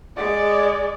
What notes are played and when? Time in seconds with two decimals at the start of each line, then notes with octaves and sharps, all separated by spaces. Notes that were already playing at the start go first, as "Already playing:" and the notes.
0.17 G#3 D5